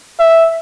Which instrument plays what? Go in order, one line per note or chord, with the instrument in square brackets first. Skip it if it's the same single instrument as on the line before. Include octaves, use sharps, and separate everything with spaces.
[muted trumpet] E5